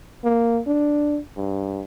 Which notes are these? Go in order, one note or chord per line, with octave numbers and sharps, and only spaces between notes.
A#3
D4
G2